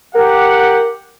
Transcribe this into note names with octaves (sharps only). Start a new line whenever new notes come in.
G4 A#4 F#5